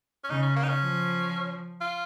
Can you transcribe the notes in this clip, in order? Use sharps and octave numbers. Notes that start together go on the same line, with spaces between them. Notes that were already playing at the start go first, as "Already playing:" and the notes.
C#4
C#3 D#4
C#4
A#3
D#4
C#4
F3
F4